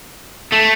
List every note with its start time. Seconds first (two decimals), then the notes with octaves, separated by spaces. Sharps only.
0.52 A3